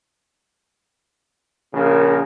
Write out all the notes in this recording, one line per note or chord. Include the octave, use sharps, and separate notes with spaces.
A#1 C#3 A#4